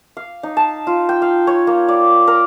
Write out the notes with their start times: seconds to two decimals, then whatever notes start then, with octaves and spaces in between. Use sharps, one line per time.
0.17 F5
0.43 D#4
0.57 A5
0.87 F4
1.09 G5
1.22 F5
1.47 C#5
1.67 A#3
1.88 D5
2.27 A#4